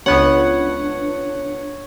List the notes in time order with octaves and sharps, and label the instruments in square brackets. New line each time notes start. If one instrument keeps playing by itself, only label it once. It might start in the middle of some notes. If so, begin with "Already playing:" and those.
[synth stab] C#2 B3 F#5 [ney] D4 [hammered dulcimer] C#5